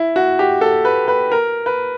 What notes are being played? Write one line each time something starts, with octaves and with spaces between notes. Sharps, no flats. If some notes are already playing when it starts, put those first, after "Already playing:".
Already playing: E4
F#4
G4
A4
B4
B4
A#4
B4